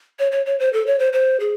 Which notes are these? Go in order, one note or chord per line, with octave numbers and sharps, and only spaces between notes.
C#5
C#5
C#5
C5
A4
C#5
C5
C5
G#4